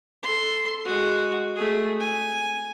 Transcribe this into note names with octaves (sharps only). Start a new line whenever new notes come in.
A4 C6
G#3 F#4
A3 G#4
G#5